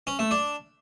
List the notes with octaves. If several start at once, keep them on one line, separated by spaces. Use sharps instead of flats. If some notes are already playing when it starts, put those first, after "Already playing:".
C#4
A3
D4